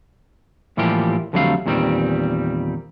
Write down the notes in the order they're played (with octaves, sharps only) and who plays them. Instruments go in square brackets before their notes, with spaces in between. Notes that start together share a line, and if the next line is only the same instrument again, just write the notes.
[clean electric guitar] A2 E3 F3 G3 A#3 G4
F2 D3 F#3 G3 A3 F5
E2 A#2 D#3 G3 C4